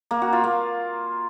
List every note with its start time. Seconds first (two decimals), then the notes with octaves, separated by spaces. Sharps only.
0.11 A#3
0.22 F#4
0.33 F4
0.44 A#3